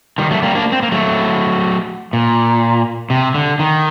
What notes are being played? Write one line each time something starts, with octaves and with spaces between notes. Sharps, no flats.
D#3 G3
F#3 A3
G3 A#3
A#3 D4
C4
A#3
F#3 A3
A#2
C3
D3
D#3